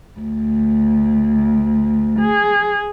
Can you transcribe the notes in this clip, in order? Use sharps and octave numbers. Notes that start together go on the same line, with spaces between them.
D2
G#4